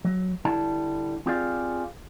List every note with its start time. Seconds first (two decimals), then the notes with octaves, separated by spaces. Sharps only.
0.05 F#3
0.45 D3 G3 E4 A5
1.26 C4 F4 G4 G#4 D5 F5